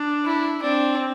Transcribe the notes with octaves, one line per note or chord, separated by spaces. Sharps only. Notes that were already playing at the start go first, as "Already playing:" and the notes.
Already playing: D4
E4
C4 D4